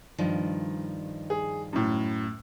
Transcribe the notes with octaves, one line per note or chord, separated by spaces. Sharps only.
G2 D#3 F3
G#4
F#2 A2